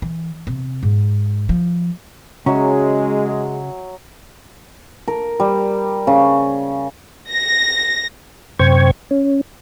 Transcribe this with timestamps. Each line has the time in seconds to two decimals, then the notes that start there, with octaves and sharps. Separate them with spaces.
0.02 E3
0.47 C3
0.83 G#2
1.49 F3
2.46 C#3 F#3 G#3 C#4 E5 G#5
5.08 A#4
5.40 G3
6.07 C#3
7.32 A#6
8.59 F#2 C3 C5 G5 C#6 G#6
9.11 C#4